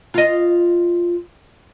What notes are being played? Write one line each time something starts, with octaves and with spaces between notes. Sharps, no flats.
F4 D#5